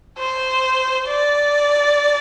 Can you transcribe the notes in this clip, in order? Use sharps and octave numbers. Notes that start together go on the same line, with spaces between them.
C5
D5